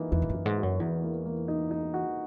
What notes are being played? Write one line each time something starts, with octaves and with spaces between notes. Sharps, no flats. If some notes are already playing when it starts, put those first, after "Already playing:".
Already playing: E3 A#3 D#4
E2 E3
G#2
F#2
E3
G#2
F#4
F#2
E2 E3
A#3
A#3
D#4
D#4
F#4